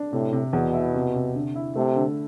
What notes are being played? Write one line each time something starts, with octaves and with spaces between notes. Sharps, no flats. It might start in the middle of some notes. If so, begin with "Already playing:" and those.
Already playing: D4
A2 C3
C3
E2 B2
E4
C3
C3
D3
E4
C3 A3
D3